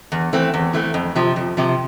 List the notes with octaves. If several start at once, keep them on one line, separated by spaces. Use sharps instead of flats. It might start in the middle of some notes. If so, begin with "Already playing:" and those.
E2
E3 A3 C4
E2
E3 A3 C4
F2
C3 F3
F2
C3 F3